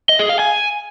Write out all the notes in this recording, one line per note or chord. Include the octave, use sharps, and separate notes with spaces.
D#5
G#4
F5
G#5